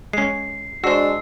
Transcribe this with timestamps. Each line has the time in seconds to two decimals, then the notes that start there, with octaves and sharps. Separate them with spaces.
0.13 G#3 C#4 C7
0.84 G#3 D4 F#4 C5 E6 C7